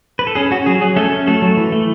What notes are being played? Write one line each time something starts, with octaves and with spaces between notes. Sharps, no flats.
B4
A4
C#4 G#4
C#4 F#4
F#3 G#4
F#3 G#4
A3 C#4 A4
C#4
F#3 A3 A4
F#3
E3
A3